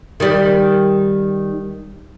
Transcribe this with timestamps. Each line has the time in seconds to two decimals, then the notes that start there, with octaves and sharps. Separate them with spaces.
0.20 D#3 G3